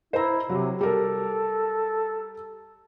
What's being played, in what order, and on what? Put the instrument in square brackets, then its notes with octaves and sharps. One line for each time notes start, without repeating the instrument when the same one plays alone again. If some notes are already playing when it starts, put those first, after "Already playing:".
[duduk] E4 [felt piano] C5 A#5
[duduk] C3 [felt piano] F#3
[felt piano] G3 A#4 [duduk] A4